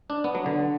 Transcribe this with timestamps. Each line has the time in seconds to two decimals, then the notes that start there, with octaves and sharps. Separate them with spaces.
0.10 D4
0.24 B3
0.35 F#3
0.46 D3